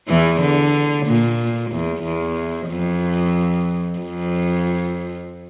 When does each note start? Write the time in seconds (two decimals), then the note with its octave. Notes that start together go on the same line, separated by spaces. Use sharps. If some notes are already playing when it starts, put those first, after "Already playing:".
0.08 E2 E3
0.41 D3
1.07 A#2
1.71 E2
2.03 E2
2.68 F2
3.99 F2